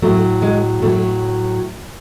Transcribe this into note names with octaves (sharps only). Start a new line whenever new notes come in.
A2 F#3 A3
G#3
A2 F#3 A3